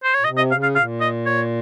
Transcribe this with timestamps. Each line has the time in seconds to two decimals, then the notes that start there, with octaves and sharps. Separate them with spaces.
0.04 C5
0.14 C#5
0.21 A#2
0.25 C3 D#5
0.37 D#5
0.51 C#3 F5
0.63 F5
0.76 A#2 F5
1.01 D#5
1.26 C#5